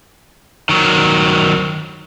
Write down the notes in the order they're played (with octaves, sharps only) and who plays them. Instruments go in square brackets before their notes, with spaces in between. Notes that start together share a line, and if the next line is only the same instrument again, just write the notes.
[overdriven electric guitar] D#3 F#3